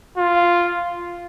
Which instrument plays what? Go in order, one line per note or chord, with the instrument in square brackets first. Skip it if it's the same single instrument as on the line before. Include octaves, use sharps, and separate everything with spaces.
[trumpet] F4